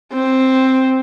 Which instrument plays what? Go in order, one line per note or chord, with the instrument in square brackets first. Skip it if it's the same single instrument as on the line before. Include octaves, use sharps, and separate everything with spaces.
[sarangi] C4